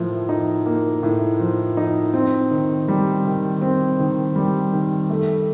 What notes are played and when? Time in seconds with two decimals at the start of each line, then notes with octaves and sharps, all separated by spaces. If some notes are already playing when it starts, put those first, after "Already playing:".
Already playing: A2 F3 A#3
0.29 D#4
0.66 A#3
1.03 A2
1.40 F3
1.77 D#4
2.14 C4
2.51 D#3
2.88 G3
3.25 D#3
3.61 C4
3.99 D#3
4.36 G3
4.73 D#3
5.10 A3